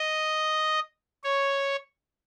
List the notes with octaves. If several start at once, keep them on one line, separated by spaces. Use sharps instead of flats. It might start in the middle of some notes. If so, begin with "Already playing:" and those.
Already playing: D#5
C#5